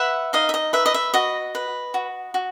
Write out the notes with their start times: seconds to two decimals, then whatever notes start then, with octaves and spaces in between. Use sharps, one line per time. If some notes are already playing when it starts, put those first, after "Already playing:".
Already playing: B4 E5 F#5
0.33 D#4 D#5 F5
0.49 E5
0.54 D#5
0.73 B4 E5
0.86 D#5
0.94 E5
1.14 F#4 D#5
1.55 B4
1.94 F#4
2.34 F#4